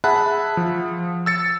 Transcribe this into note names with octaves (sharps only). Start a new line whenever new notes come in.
G#4 E5 F#5 A5 B5 F#6
F3
E6 A6 C#7